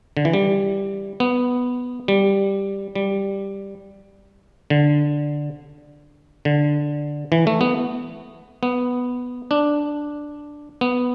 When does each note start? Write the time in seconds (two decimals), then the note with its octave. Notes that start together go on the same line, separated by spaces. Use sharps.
0.17 D3
0.25 E3
0.34 G3
1.20 B3
2.08 G3
2.95 G3
4.70 D3
6.45 D3
7.32 E3
7.47 A3
7.61 B3
8.63 B3
9.51 D4
10.81 B3